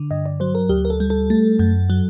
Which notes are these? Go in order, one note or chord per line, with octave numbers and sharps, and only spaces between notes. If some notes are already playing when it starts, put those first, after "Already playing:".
Already playing: D3
G2 D#5
D5
F#3 C5
A#4
D2 G4
A#4
A4
G3
A4
A3
F#2
F#3